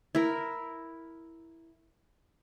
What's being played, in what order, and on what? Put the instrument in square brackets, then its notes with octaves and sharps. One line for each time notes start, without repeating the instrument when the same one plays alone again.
[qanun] E4 A#4